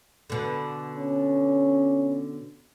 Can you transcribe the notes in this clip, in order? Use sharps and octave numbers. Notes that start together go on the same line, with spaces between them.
B2 D3
C#4